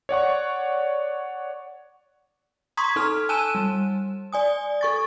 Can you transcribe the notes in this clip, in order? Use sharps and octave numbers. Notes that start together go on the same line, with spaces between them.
C#5 D5 F#5 C#6
A#5 C6 C#6 D#6 G#6 B6
D#4 A4 F6
G#5 A5 E6 F#6 D#7 E7
G3
D5 G#5 D#6
A4 C#6 A6